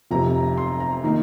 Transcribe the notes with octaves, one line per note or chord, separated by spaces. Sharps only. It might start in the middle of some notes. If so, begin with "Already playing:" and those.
F1 F2 C3 A#5
C6
A#5
D#3 A#3 D#4